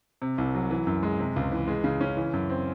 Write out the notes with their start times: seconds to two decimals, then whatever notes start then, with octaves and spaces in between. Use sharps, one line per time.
0.22 C3
0.38 C2
0.55 F#3
0.71 E3
0.87 F#2
1.03 G#3
1.19 C3
1.36 C#2
1.52 E3
1.68 G#3
1.84 C#3
2.01 C#4
2.17 E3
2.33 F#2
2.49 C4